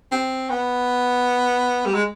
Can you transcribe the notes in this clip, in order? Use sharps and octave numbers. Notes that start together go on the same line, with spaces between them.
C4
B3
G3
G#3